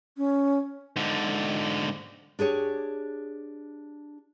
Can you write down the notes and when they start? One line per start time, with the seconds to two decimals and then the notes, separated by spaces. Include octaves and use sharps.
0.17 C#4
0.96 G#2 D3
2.39 D4 G4 G#4 C#5